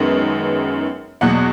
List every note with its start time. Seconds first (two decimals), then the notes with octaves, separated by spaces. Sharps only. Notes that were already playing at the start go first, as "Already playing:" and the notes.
Already playing: F#2 D#3 G#3 B3
1.21 E2 B2 F#3 F#5 F#6